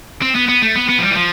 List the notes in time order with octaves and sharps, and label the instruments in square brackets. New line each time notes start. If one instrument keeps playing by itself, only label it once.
[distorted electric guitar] C4
B3
B3
A3
B3
B3
F3
G3
E3
F3